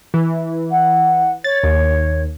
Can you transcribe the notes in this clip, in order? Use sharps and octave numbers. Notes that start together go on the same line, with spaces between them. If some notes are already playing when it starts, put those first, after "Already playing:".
E3
F#5
C#5 A6
D#2